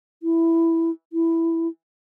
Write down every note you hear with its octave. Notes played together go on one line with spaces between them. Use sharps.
E4
E4